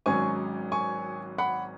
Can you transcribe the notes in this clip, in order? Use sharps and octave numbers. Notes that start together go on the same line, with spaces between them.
G#1 G#2 F#3 C#4 G#5 C#6
G#5 C#6
F#5 B5